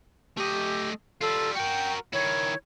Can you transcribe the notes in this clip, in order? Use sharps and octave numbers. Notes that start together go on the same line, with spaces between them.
A3 G4 D#5
G3 F4 A4
F#4 A#4 G5
D#3 E4 C#5